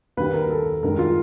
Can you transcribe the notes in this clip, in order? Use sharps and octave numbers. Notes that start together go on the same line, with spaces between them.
D#2 D#3 G3 B4
A#4
A4
G2 D#3 G#3 A#4
F4